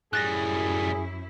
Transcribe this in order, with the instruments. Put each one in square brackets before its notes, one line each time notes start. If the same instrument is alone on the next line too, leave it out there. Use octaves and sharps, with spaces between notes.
[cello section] F#2 E4 [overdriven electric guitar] A2 G3 [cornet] G#4 [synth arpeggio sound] F#6 A6 A#6